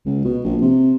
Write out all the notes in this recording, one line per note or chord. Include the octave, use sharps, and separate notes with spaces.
C#2
B2
A#1
C3